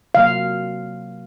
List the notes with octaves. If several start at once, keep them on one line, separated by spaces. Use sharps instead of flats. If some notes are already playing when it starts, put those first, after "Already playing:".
C3 F#3 A#3 F5